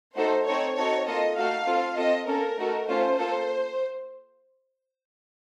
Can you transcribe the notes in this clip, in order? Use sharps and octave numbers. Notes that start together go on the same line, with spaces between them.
A3 D#4 F#4 A4 C5
C4 D#4 A4 C#5
C4 D#4 F#4 A4 C#5
A#3 F4 A4 D#5
A3 D#4 F#4 A4 F5
C4 F4 A4
C4 F4 A4 D#5
A#3 C#4 A4 A#4
A3 D#4 F#4 A4
A3 C#4 F4 A4 C5
A#3 F4 A4